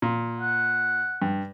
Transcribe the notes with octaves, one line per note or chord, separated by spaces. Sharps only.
A#2
F#5
G2